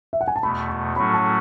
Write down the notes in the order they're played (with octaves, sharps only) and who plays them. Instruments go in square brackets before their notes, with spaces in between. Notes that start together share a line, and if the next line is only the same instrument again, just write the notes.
[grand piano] E5
F#5
G#5
A5
[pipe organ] E2 B2 A3 [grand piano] B5
[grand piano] C#6
[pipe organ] A2 F#3 A3 C#4 F#4 [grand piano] B5
[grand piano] A5